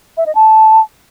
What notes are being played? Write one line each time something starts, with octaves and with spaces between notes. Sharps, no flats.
E5
D#5
A5